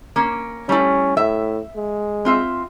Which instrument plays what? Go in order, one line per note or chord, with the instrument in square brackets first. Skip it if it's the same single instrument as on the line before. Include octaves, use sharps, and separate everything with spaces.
[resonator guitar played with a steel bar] A#3 C#4
[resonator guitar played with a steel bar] G3 A3 E4 [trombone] C#4
[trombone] A2 [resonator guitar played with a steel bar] E5
[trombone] G#3
[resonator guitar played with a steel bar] C4 F4 E5